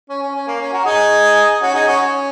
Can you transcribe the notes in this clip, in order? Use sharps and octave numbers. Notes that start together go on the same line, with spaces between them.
C#4
C#4
C#4
A#3
C#4
F#4 A#4
D#4 G#4
C#4 F#4
D#4 G#4
C#4 F#4
C#4